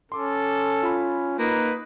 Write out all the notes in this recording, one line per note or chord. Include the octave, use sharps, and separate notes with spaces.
C#4 A4 C6 D6
F4 B5
A#3 D#4 B4